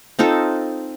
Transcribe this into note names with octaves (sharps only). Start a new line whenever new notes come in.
C4 D#4 F4 A4